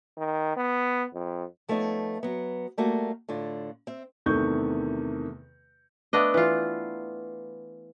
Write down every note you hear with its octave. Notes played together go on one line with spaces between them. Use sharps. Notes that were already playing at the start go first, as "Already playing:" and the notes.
D#3
B3
F2
F3 A3 B3 D#4 C#5
F#3 B3
G3 A3 A#3 F#4
A2 D3 F4
C4 E5
E2 C3 D#3 A3 C#6 G6
A3 B3 D4 D#5
E3 F4